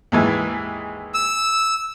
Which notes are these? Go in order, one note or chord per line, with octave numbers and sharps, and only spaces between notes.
D#2 G#2 E3
E6